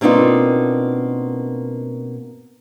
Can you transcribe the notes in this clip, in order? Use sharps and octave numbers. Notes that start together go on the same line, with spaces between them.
B2 A#3 C4 D4 D#4 F4